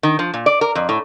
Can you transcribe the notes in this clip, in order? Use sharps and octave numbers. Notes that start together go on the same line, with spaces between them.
D#3
F3
A#2
D5
A#4
F2
A2